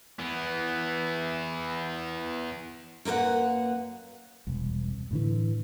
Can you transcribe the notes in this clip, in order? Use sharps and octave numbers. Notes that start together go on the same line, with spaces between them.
E3 B3
F#2 A#3 A#4 B4 F#5
E1 C2
A2 D3 E3